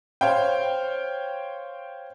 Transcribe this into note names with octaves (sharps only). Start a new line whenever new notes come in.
C5 C#5 F5 G5